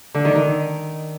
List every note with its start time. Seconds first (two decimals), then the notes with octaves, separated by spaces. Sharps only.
0.14 D3
0.25 D#3
0.35 D#3